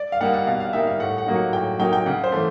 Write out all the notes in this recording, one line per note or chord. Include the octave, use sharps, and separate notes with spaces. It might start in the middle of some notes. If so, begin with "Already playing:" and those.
Already playing: D5
F5
G3 A#3 D#4 F#5
F#5
B2 F5
F5
G3 A#3 D#4 E5
F5
A2 F#5
F#5
F#3 A#3 D#4
F#5
A2 G5
F#3 A#3 D#4 G5
G5
C#3 F#5
C5
E3 A3